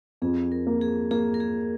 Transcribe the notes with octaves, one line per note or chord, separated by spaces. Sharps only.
F2 G#4
A#4
A#3
G#4
A#3 G#4
A#4
G#4